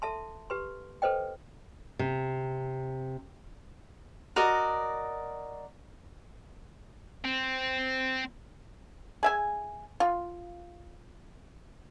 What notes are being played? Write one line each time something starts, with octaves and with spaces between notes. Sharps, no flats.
A4 E5 A5 C6
G4 B4 C6
A4 B4 C5 D#5 G5
C3
F#4 A#4 D5 D#5
C4
G#4 E5 G#5
F4